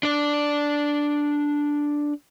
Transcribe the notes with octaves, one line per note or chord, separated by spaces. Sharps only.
D4 D5